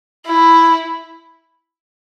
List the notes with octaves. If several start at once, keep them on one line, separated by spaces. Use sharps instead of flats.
E4